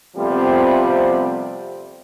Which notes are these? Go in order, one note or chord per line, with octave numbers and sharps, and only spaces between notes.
C3 F3 G3 A3 B3 C4